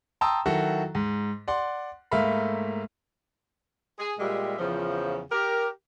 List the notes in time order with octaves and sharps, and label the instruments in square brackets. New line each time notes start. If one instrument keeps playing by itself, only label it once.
[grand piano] G5 A5 A#5 C6 D#6 E6
D#3 F#3 E4 F#4 A4
G#2
D5 F#5 C6
G#2 A3 A#3 E5 F5 B5
[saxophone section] G#4
A#2 G3 G#3 G4 E5
E2 C#3 F3
G4 A#4